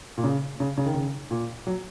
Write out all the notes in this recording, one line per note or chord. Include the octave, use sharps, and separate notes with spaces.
A#2
C#3
C#3
C#3
D#3
C#3
A#2
F#3